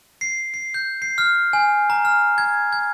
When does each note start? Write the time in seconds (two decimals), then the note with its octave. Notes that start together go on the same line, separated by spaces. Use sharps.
0.21 C7
0.54 C7
0.74 G6
1.02 C7
1.18 F6
1.53 G#5
1.90 A#5
2.05 F6
2.38 G#6
2.72 G#6